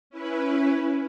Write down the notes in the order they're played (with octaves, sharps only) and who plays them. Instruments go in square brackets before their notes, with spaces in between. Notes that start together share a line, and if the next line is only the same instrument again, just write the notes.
[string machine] C#4 E4 B4